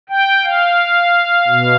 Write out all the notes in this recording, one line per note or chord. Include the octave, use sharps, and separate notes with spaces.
G5
F5
B2